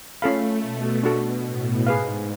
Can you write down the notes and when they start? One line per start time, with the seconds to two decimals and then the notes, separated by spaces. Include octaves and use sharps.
0.21 A3 C#4 F4 A4 F5 B5
0.62 B2
1.03 B2 D4 F#4 A4
1.44 A2
1.86 G#2 G#4 B4 F5